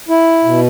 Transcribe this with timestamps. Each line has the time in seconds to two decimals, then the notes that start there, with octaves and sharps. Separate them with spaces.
0.09 E4
0.44 B2